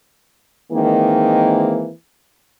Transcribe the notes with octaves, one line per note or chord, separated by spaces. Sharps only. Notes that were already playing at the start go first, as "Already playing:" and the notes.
D#3 E3 G#3 A#3 C4